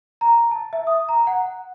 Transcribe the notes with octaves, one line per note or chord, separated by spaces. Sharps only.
A#5
A5
E5
D#6
A#5
F#5